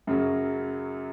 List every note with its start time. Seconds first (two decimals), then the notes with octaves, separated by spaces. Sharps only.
0.07 F#2 C#3 F#3